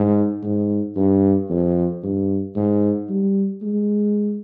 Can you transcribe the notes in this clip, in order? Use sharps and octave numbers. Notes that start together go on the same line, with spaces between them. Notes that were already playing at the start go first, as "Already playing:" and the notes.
Already playing: G#2
G#2
G2
F2
G2
G#2
G3
G#3